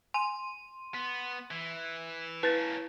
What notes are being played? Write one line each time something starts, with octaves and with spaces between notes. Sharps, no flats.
G#5 C6 D#7
B3
E3
A#3 C#4 E4 B4 A6